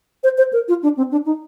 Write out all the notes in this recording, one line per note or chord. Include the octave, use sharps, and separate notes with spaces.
C5
C5
A#4
F4
D4
C4
D4
D#4